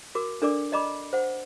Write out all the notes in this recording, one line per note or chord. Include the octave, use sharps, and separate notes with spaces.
F#4 A#4 D6
D4 A4 A#4 D5 D6
D5 D#5 A#5 B5 D6
C5 F#5